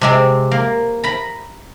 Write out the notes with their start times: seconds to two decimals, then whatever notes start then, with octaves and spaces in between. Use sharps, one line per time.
0.01 C3 G#3 C4
0.51 A#3
1.04 A#5 B5